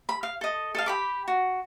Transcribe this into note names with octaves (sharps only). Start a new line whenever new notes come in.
B5
F5
A4 D#5
A4 D#5 F5
G4 B5 D6
F#4